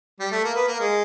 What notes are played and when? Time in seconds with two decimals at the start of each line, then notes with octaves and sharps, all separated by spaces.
0.20 G3
0.31 A3
0.44 A#3
0.55 B3
0.68 A#3
0.80 G#3